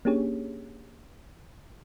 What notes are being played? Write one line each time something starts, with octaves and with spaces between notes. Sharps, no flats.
A#3 C#4 D4 G4 G#4 C#5